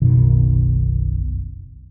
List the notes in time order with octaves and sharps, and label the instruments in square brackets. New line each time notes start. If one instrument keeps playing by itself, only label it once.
[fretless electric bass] F#1 B1 B2 D#3